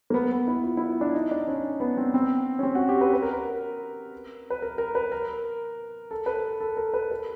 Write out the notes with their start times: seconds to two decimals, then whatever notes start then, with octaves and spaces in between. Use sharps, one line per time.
0.10 A#3
0.14 B3
0.32 B3
0.48 E4
0.64 F4
0.77 E4
1.01 D4
1.14 D#4
1.31 D4
1.48 C#4
1.80 B3
1.97 C4
2.14 C4
2.59 C#4
2.63 C4
2.75 F#4
2.89 G4
3.01 B4
3.14 B4
3.23 A#4
3.33 B4
4.50 B4
4.62 A#4
4.78 A#4
4.95 B4
5.12 A#4
6.11 A4
6.26 B4
6.37 A#4
6.60 A4
6.77 A#4
6.94 B4
7.11 B4